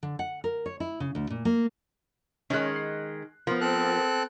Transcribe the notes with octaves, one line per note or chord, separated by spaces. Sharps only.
D3
F#5
A#4
C#5
E4
C#3
D2
A#2
A#3
D#3 G#3 C#4 F#6
C7
F3 B3 A#4
C4 A4 F#6